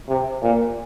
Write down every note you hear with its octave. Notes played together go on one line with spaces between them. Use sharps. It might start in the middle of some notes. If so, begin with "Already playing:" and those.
C3
A#2